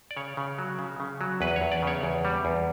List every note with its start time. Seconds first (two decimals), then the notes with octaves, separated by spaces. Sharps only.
0.11 D5
0.17 C#3 C#5
0.37 C#3
0.59 F#3
0.79 C#3
1.00 C#3
1.21 F#3
1.41 E2 B4
1.56 C#5
1.61 E2
1.72 D5
1.83 C#3 C#5
2.03 E2
2.25 G3
2.45 E2